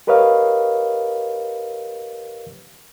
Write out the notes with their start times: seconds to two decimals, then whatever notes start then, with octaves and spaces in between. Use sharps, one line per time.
0.07 G4 A#4 B4 C#5 D#5 F5